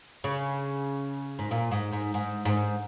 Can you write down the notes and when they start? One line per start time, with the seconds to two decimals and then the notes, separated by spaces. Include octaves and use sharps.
0.24 C#3
1.39 G#2
1.51 A#2
1.71 G#2
1.92 G#2
2.14 G#2
2.45 G#2